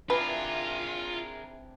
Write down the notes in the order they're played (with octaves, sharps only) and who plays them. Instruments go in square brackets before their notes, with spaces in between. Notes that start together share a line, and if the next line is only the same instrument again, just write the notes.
[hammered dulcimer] C3 E3 D4 [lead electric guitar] F4 [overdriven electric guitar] G#4 A#4 [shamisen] B4